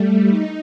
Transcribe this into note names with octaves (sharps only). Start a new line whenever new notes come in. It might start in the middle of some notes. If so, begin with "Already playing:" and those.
Already playing: G3 A3
D#4